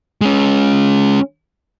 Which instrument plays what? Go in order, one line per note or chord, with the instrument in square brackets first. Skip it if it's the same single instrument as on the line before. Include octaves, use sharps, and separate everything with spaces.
[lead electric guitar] G#3 C#4